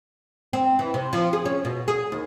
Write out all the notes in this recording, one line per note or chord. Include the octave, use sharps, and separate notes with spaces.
C4
E3
C3
F3
G#4
C#4
B2
G#4
D#2